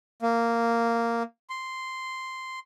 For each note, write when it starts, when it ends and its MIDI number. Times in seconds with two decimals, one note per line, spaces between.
0.22 1.23 58
1.50 2.59 84